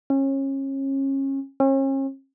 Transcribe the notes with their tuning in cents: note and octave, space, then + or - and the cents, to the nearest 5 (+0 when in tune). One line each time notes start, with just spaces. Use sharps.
C#4 -30
C#4 -40